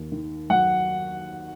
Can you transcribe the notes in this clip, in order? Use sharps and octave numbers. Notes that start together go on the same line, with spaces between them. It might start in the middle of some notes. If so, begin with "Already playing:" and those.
Already playing: D#2
D#3
F#3 F#5